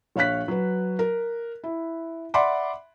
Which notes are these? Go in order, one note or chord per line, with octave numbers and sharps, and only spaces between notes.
A#1 C#5 F5 F#6 B6
F#3 B4
A#4
E4
D5 E5 F#5 B5 C6 D6